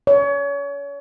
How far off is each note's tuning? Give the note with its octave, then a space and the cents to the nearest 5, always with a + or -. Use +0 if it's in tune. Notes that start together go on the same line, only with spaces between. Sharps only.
C#5 +30